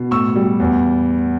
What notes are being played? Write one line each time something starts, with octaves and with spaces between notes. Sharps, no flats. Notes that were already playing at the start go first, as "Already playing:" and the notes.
Already playing: B2
A2 C#6 E6
G3
E2